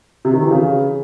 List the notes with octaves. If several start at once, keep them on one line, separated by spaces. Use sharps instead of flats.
C3
D#3
E3
C#3